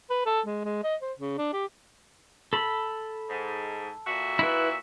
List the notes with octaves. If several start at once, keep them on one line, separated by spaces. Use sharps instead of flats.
B4
A4
G#3
G#3
D#5
C5
C#3
D4
G4
A4 B5
G#2
A#2 F#4 E5
E4 B4